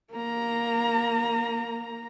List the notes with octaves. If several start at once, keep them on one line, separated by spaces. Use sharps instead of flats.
A#3 A#5